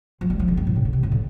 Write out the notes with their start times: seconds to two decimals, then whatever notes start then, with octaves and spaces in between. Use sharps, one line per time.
0.21 F3
0.30 G3
0.39 F3
0.48 D3
0.57 G2
0.67 A2
0.76 C3
0.85 D3
0.93 C3
1.03 A2
1.12 D3